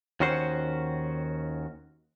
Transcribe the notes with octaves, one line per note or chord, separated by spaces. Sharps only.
D#2 D#3 C#4 F#4 C5